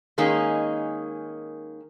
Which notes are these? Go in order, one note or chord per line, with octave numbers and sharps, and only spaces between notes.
D#3 G#3 A#3 C#4 D#4